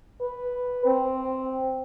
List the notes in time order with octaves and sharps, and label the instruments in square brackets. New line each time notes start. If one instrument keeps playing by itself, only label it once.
[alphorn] B4
C4